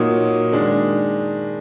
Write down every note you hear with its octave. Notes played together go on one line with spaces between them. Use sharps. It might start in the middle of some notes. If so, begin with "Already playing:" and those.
Already playing: A#2 F#3 A#3 D#4 D#6
D#3 G#3 D4